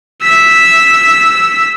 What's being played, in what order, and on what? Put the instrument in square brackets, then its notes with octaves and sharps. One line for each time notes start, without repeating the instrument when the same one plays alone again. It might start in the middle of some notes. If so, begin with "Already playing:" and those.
[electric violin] E6 B6